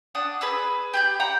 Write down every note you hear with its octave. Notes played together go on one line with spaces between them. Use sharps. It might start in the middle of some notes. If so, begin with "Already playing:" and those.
D4 F#5 D#6
G#4 B4 B5 E6
G4 B5 G6
F#5 G5 A#5